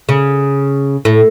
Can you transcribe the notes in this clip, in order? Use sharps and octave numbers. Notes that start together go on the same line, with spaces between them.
C#3
A2